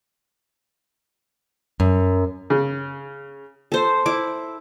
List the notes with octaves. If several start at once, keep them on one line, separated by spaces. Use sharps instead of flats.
F#2
C#3
A4 C5
E4 D6